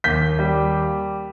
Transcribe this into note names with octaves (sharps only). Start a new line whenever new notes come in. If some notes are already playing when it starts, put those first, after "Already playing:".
D#2 G6 B6
G3